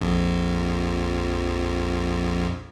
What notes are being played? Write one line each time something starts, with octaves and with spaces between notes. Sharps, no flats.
A#1 F2